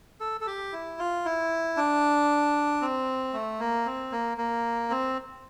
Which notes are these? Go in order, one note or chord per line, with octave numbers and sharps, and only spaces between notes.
A4
A4
G4
E4
F4
E4
D4
C4
A3
A#3
C4
A#3
A#3
C4